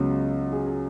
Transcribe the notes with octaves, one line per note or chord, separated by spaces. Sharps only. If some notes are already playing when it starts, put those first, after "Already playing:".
Already playing: C#2 C#3 F#3 B3 F#4
G#4
G#4